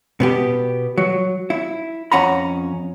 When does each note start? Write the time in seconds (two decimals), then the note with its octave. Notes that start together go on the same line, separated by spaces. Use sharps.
0.20 B2 B3 G4
0.98 F#3
1.50 E4
2.12 F2 C#4 F#5 A#5 B5